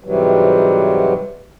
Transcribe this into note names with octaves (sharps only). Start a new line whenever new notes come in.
G#2 C3 E3 F#3 G3